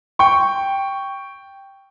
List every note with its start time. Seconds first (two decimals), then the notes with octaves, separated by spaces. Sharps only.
0.19 G5 C#6